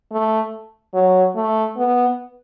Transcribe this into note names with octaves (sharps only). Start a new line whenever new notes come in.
A3
F#3
A3
B3